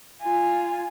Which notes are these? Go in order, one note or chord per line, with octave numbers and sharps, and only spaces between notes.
F4 G#5